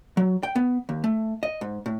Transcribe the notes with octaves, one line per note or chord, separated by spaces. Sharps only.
F#3
G5
B3
D#2
A3
D#5
G#2
A2